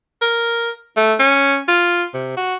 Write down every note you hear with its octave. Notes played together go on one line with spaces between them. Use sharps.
A#4
A3
C#4
F4
C3
F#4